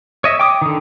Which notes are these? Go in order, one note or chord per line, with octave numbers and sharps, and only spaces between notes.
C#5 D#5 E5
G5 D6 D#6
D3 D#3